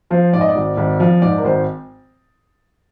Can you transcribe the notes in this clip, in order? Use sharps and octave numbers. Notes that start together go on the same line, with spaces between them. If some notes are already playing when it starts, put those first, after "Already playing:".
F3 C5
G#2 D5
D#5
D5
G#1
G#1
F3
G#2 D5
A#4
G#1 C5